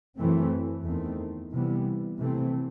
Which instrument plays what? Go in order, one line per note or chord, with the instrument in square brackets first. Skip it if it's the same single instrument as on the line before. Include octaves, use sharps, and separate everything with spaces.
[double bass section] F#2 E3 A3 C4
E2 D#3 A3 C4
C3 E3 G3 B3
C3 E3 A3 C4